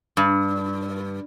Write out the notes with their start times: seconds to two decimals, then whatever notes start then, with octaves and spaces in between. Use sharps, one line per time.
0.17 G2